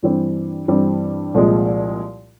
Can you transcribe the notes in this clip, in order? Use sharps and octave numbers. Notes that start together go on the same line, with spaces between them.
G2 E3 G3 C4
G2 E3 G3 C4
C2 A#2 F3 G#3